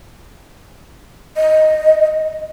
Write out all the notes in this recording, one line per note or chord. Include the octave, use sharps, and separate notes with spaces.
D#5